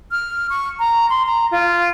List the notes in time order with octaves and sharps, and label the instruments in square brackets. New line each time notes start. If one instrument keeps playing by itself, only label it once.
[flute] F6
C#6
A#5
C6
A#5
F4